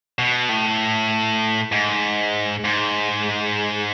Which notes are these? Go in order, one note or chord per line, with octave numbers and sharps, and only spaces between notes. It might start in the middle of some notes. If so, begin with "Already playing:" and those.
B2
A2
G#2
G#2